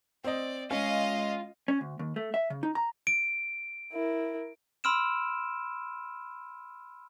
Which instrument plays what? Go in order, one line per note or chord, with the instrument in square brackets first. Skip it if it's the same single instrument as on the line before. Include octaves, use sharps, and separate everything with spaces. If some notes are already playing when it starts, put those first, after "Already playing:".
[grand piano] C4 D#5 [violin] D5
[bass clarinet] G#3 [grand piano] C#4 [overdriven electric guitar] F4 [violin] D#5 F5
[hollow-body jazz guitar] C#4
D2
D#2
A3
E5
C#3
D#4
A#5
[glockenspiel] D7
[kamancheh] E4 A#4
[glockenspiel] B5 C6 E6 F6 D7 E7